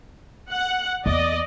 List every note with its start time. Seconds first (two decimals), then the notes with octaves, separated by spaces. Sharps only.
0.51 F#5
1.06 E2 A#3 D5 D#5